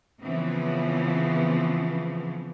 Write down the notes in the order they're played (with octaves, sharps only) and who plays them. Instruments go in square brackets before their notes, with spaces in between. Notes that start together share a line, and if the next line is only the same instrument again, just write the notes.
[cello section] C#3 E3 F3 B3 C4